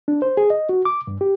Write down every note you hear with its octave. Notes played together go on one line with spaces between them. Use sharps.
D4
C5
G#4
D#5
F#4
D6
G2
G4